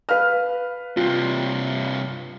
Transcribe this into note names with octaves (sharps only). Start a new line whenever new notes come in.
B4 F5 F6
G2 C3 F4